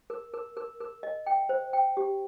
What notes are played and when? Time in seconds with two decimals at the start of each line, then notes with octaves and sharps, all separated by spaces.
0.10 A#4
0.34 A#4
0.57 A#4
0.80 A#4
1.03 D#5
1.26 G5
1.49 C5
1.73 G5
1.97 G4